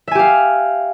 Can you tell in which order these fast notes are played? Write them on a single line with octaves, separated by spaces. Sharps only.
E5 G#5 G4 F5